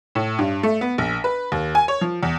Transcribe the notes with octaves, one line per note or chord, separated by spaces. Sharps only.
A2
G2
A3
B3
A#1
B4
D#2
G#5
C#5
F3
E2